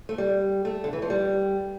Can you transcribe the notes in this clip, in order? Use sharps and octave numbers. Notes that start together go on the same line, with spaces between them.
A3
G3
A3
D3
E3
F3
G3